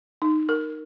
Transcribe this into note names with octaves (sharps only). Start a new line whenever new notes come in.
D#4
A#4